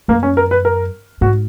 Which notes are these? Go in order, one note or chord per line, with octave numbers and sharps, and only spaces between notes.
F#2 A#3
C#4
A#4
B4
A#4
G#2 F#4